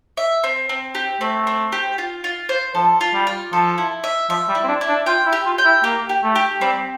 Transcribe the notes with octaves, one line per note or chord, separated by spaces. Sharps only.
E5
C4
C4
G4
A3 C4
C4
G4
F4
F4
C5
F3 A4
F4
G3
F4
F3 A4
E4
E5
F3 E5
G3
E4
C4
D4
E4
D4
F4 G5
E4
G4
F4
G5
E4
A#3 G4
G4
A3
G4
G3 C4